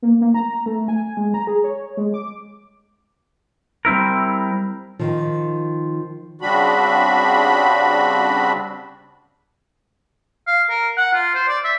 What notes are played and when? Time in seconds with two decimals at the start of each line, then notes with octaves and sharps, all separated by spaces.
0.02 A#3
0.21 A#3
0.34 A#5
0.66 A3
0.88 G#5
1.17 G#3
1.34 A#5
1.47 G#4
1.64 C#5
1.97 G#3
2.14 D6
3.85 G3 C4 E4 A#4
4.99 D#3 F3
6.41 C#3 G3 C4 D4 F#4 B5
10.47 F5
10.70 A#4
10.97 F#5
11.13 F4
11.35 C5
11.49 D5
11.64 E5